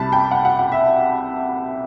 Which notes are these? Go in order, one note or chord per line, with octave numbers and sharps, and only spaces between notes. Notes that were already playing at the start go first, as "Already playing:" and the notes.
Already playing: C2 C3 G3 A5 B5
G5
F#5
F#5
F#5
E5